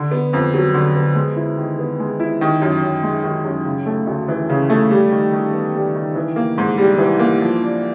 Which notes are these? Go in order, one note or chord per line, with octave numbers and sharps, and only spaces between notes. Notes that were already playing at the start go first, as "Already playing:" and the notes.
Already playing: D3
B3
F2
F#3
D3
B3
G#3
E4
D#3
B3
G#3
E4
D#3
F#2
F#2
G#3
D#3
F#2
C#3
A3
D2
E3
C#3
A3
G3
D#3
D#3
B3
G3
D#3
E3
A#3
G#2
G3
E3
A#3
F3
D4